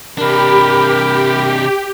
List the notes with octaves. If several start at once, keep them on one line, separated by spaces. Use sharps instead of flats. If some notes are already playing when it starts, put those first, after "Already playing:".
C3 D4 G4 A#4 B5